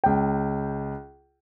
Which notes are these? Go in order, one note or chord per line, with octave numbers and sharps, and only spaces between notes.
C#2 G5